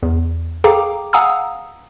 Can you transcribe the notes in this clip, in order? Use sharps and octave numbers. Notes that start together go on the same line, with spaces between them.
E2
G#4 A4 F5 G5 A#5 D6
F5 F#5 G#5 A#5 D#6 E6